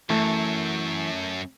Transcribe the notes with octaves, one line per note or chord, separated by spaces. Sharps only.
C#2 F#2 E3 A3